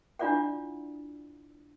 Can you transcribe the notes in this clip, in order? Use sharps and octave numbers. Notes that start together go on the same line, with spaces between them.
D4 E4 F4 D5 E5 F#5